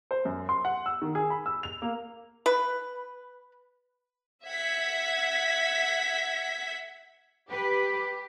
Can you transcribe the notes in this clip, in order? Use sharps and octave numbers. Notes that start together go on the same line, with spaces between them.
C5
F#2
C6
F#5
E6
D#3
G#4
B5
E6
F7
A#3
B4
E5 F#5 G#6 B6
G4 B4